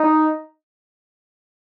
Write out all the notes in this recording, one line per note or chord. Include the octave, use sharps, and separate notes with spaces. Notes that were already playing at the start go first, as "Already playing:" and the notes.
Already playing: D#4